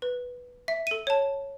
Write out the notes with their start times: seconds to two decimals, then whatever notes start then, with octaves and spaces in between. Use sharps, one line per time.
0.02 B4
0.68 E5
0.87 A4 D#7
1.07 C#5 A5